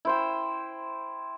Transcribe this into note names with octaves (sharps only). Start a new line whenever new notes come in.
E4 C5 G5